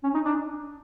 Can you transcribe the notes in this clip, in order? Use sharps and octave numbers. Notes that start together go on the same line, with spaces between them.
C#4
D#4
D4